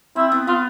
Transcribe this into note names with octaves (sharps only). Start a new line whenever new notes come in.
C4 E4
B3
B3 F4